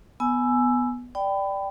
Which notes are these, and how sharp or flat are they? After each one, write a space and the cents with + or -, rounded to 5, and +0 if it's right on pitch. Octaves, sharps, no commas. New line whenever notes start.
B3 +0 G#5 +20 E6 +5
D5 +0 G5 +0 B5 +20